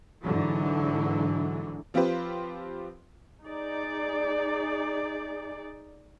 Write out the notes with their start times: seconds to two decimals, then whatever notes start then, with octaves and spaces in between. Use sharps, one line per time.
0.23 G#2 D3 E3 F#3
1.94 F3 C4 F4 G4 B4 C5
3.43 D#4 G#4 D5